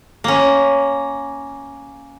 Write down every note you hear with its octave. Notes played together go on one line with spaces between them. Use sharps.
A#3 C#4